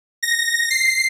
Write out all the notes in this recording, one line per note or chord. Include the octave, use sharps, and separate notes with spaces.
A#6
C7